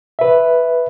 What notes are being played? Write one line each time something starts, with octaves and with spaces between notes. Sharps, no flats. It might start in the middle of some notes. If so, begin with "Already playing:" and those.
B4 E5